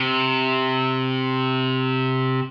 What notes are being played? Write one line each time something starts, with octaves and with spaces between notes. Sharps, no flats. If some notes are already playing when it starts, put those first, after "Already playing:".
Already playing: C3